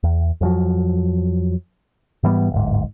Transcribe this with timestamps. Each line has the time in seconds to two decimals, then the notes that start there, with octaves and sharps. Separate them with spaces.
0.04 E2
0.41 F2 F3 F#3
2.23 G#2 E3 G3 B3
2.52 D1 G1 G#2